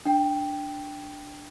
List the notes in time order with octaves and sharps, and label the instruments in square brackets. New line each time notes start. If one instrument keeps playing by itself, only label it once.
[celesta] D4 G5